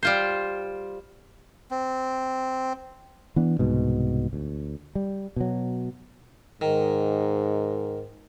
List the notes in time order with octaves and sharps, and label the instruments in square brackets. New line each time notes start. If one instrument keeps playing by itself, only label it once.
[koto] G3 F4 C5
[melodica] C4
[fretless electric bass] E3 B3 D4
C2 G#2 B2
D2
G3
B2 F#3
[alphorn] G#2 [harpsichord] D#3